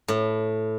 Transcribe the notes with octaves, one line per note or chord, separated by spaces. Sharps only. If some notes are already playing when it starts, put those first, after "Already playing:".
A2